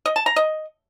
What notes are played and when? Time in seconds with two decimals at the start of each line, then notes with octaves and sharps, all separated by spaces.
0.06 D#5
0.16 A5
0.26 A#5
0.36 D#5